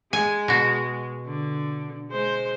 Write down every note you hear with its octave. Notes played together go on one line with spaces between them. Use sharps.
G#3 G#5
B2 F#4
D3
G#3 C5